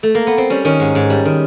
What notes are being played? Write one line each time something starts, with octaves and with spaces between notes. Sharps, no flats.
A3
A#3
B3
C4
G3 C#4
D#3 C#4
G#2
G#2
G3
D#3